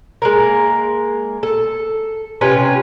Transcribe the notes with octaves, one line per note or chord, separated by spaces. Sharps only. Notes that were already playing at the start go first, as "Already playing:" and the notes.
G#3 A#3 A#4
A4
C3 C#4 F4 B4